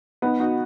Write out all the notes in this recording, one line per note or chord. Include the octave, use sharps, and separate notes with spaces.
B3 D#4
D#4 F#4